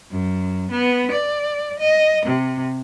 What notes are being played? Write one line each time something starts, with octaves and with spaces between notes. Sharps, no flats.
F#2
B3
D5
D#5
C3